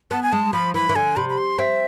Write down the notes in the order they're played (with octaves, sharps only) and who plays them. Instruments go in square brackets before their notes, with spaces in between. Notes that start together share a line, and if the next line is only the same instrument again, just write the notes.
[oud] B3 [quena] A5
[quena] G#5
[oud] G#3 [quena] A5
[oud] F3 [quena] B5
[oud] E3 [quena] B5
[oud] E3
[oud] D3 [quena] G#5
[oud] C3 [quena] B5
[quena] B5
C6
[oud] C4 [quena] E5